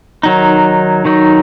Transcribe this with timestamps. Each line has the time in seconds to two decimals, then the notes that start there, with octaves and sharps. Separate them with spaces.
0.23 D#3 F#3 D#4
1.05 D#3 F#3 D#4